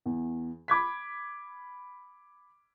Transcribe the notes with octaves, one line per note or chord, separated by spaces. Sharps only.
E2
B5 D6 G#6 B6